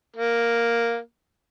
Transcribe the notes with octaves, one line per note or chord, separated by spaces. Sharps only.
A#3